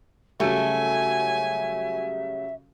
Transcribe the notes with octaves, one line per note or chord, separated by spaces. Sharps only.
C#3 F#3 G3 A3 E5 G#5